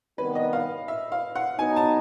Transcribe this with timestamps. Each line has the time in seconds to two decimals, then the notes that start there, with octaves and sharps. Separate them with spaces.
0.18 C3 D#3 G3 B3 B4
0.35 D#5
0.53 F5
0.88 E5
1.12 F5
1.35 F#5
1.58 F#3 B3 D#4 G#5
1.76 A5